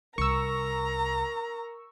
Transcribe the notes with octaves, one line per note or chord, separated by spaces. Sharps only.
C2 A#4 A#5 C#6 E6